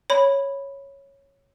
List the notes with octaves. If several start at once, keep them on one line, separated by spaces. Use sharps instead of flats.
C#5 B5